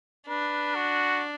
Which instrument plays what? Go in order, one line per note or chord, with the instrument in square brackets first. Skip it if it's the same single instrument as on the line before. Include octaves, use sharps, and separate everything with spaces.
[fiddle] D4 [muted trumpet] B4
[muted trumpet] F#4